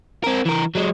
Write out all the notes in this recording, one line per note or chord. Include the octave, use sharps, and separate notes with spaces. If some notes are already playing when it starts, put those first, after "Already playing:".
C4 A#4
E3 A#4
F#3 G#3